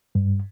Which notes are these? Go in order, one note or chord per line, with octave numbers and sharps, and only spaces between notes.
G2